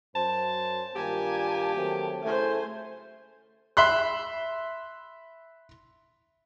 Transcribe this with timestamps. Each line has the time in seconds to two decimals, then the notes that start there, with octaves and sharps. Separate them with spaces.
0.15 F#2 C5 A5
0.96 G2 D#3 A#3 F4 G4 G#5 A5
1.76 D#3 F#3 A3 C4
2.23 C#3 A3 E4 A4 C5 G#5
3.77 E5 B5 C6 F#6